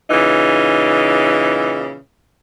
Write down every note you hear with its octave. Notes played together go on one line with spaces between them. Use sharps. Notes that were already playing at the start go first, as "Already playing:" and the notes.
A#2 C#3 E3 D#4